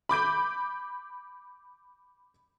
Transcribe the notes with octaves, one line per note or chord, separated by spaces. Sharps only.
B5 D6 G6 D7